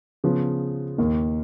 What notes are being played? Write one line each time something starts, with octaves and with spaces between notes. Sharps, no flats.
C#3 F3 B3
D#2 D#3 A#3